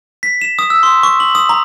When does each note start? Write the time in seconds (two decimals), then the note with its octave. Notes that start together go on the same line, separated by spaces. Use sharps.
0.23 B6
0.41 E7
0.59 D#6
0.70 E6
0.83 C6
1.03 C#6
1.20 F#7
1.35 D#6
1.49 A#5